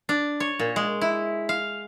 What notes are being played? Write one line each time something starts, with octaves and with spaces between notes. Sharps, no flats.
D4
C#5
A#2
G#3
E4
F5